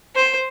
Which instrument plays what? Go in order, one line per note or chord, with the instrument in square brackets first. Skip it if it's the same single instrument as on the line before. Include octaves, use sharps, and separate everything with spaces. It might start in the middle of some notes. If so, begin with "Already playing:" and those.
[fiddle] C5